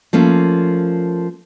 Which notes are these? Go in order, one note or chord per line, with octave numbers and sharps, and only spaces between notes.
F3 A3 A#3 C#4